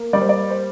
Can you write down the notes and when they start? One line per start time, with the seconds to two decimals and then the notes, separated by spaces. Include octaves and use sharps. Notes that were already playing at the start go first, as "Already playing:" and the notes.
Already playing: A#3
0.13 G3 D5
0.21 C5
0.29 D5
0.50 C5